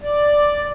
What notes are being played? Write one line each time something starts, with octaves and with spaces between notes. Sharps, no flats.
D5